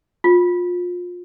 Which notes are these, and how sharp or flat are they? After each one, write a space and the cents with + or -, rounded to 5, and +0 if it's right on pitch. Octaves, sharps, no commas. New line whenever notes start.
F4 +25